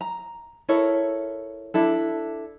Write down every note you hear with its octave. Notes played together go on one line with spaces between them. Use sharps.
A#5
E4 A4 A#4 C#5
D4 E4 A4